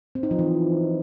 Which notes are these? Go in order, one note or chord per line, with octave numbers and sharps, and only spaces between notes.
C4
D#4
F3
E3